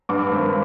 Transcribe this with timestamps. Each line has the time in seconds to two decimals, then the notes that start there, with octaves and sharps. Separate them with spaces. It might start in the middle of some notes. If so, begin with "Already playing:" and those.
0.09 G2 D6
0.31 G#1